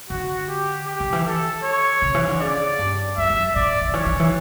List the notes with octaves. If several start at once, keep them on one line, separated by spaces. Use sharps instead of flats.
D3 F#4
G4
G4
D3
E3
A4
C#5
C#3
E3
D3
C#3 D5
G2
F#2 E5
F#2
A2 D5
D3
E3 C#5
D3
E3